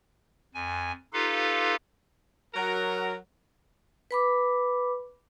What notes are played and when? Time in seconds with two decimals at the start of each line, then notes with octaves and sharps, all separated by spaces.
0.54 F2 G#5
1.13 D#4 F4 G4 A4 B4 F5
2.54 F#3 F#4 A#4
4.11 B4 B5 D6